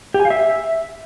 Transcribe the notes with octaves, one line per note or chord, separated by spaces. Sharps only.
G4
G#5
F5
E5